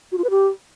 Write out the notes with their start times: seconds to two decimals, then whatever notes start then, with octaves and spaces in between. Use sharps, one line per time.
0.12 F#4
0.18 F4
0.24 B4
0.30 G4